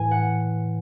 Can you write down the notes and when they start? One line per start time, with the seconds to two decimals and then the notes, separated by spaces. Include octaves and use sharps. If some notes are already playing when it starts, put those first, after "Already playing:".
Already playing: A2 E3 G#5
0.11 F#5